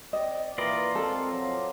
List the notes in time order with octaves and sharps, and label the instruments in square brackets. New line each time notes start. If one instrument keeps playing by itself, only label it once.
[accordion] C4 D5 [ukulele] D#5
[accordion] E3 A#3 A#4 [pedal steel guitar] F4 D5 D#5 [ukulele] B4
[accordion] G#3 A#4 [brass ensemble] C4 [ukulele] A4
[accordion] F3 F#3